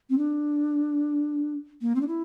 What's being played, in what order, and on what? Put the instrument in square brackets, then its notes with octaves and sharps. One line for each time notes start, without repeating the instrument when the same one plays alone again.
[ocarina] C4
D4
A#3
C4
D4
E4